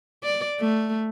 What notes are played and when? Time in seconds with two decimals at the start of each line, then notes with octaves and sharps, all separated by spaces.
0.23 D5
0.60 A3